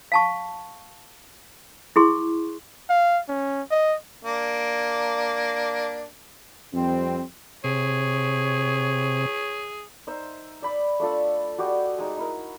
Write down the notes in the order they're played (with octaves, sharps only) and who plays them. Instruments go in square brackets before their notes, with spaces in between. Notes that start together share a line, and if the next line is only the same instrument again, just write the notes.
[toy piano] F5 A5 C#6
E4 G#4 C6 C#6
[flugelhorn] F5
C#4
D#5
[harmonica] A#3 D4
[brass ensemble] F2 G3 C4
[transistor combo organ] C3 [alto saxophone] G#4 [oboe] C#5
[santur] D#4 C5 E5
D5 B5 D6
A3 D4 F4 A4
F#4 G4 D5 D#5
G#3 D#4
D#4 E4 A#4